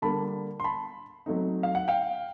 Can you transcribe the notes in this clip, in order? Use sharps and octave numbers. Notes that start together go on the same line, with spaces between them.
D3 G3 A#3 A5 B5
C6
A5 B5
F#3 A3 C4 D#4
F5
F#5
F5 G5